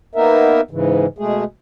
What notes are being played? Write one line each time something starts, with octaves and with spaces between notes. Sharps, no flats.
A#3 B3 D#4 A#4 E5
G#2 C#3 E3
B2 G#3 A3 G#4